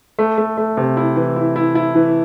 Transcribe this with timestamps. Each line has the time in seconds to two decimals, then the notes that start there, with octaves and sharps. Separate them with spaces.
0.19 A3
0.38 A3
0.57 A3
0.77 C3
0.97 E4
1.16 E3
1.36 E4
1.56 E4
1.75 E4
1.95 E3